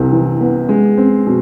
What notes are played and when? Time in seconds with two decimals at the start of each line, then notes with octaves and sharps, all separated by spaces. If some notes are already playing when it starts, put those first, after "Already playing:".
Already playing: C2 C3
0.12 E3
0.41 B3
0.69 G#3
0.98 C4
1.27 B2